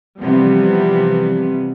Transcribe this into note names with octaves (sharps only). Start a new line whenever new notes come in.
C3 E3 F3 G3 B3